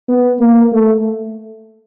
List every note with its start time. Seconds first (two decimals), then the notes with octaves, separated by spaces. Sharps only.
0.09 B3
0.40 A#3
0.72 A3